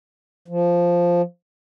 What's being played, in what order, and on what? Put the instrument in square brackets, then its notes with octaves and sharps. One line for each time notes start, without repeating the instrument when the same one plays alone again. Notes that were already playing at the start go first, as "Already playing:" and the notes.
[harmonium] F3